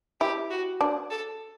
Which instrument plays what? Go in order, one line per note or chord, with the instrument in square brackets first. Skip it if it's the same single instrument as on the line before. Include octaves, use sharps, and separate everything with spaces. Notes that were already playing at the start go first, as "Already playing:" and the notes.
[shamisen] E4 [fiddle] G4
[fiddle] F#4
[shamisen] D4
[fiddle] A4